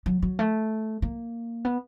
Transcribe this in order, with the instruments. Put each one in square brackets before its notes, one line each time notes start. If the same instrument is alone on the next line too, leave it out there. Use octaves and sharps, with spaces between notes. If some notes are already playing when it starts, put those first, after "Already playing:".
[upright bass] F#3
F#3
A3
A#3
B3